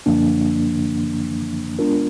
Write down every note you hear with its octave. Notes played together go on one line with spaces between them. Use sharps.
F#2 D3 F3 A#3 D4
G#3 B3 D4 F4 A#4